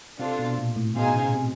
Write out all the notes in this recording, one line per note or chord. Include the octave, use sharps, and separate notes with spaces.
C3 D4 F4 A4 C5 F5
B2
A#2
A2
B2 D#4 G#4 C5 F5 G#5
C#3
C3